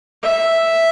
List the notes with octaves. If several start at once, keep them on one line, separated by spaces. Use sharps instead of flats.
E5